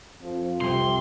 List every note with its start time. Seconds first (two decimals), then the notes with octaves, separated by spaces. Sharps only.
0.22 F2 F3
0.61 C2 C3 C4 C6